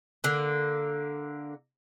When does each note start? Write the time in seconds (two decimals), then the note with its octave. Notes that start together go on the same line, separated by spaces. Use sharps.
0.24 D3 A#3